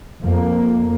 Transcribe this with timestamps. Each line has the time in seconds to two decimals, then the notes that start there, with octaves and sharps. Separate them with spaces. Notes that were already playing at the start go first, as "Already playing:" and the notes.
0.23 F2 A#3